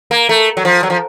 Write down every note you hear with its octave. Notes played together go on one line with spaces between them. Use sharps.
A#3
A3
F#3
F3
F#3
F3